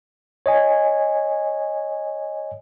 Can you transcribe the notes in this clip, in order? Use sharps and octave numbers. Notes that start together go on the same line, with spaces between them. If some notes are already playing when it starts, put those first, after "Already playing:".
C#5 D#5 G#5